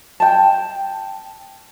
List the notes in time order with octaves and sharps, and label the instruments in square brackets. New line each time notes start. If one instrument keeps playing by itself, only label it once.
[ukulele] G5 A5